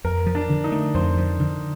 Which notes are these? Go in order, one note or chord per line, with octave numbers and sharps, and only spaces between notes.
F2 A#4
F3
D4
D3
D#4
A3
F2 C5
F3
D3